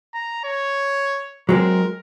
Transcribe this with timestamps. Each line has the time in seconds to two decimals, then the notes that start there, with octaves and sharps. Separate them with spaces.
0.14 A#5
0.44 C#5
1.49 F#3 G#3 C4 A#4